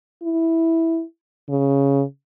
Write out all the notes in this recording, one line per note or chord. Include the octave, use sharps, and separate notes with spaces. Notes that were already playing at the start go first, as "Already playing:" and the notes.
E4
C#3